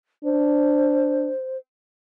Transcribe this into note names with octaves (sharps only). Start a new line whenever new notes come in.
D4 C5